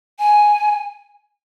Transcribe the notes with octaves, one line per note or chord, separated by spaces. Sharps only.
G#5